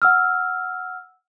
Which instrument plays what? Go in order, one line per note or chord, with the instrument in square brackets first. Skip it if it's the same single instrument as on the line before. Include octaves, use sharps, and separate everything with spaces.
[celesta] F#5 E6 F6